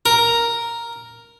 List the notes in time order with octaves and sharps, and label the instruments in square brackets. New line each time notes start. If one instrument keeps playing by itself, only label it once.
[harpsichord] A#4